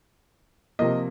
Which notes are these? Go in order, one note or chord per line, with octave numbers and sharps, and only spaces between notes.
C3 F3 A#3 D#5